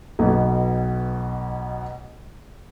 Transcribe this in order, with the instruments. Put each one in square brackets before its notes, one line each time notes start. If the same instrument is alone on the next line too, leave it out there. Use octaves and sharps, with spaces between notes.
[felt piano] B1 B2